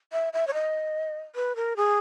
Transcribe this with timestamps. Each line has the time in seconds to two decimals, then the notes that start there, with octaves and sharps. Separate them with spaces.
0.13 E5
0.33 E5
0.47 C#5
0.54 D#5
1.36 B4
1.56 A#4
1.77 G#4